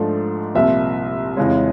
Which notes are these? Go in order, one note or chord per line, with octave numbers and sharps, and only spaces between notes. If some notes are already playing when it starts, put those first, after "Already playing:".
Already playing: G#2 F3 A3 D4
C2 A#2 F3 E5
F2 C#3 E3 G#3 C#4